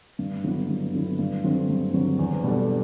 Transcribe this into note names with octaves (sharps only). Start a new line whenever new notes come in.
G2
D3 F#3 B3 E4
G2
D3 F#3 B3 E4
G2
D3 F#3 C4
G2
D3 F#3 C4
E2
B2 G3 D4 A4